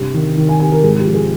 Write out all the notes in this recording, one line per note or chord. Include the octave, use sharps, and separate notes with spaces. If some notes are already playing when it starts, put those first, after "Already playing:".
Already playing: G2 C3
D#3
D#3
G#5
C3 G#5
A#4
G#2 G#4
G4
F3
G#4